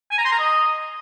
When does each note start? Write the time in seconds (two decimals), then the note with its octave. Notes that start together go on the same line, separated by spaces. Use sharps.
0.11 G#5
0.18 A#5
0.25 C6
0.32 A#5
0.39 D#5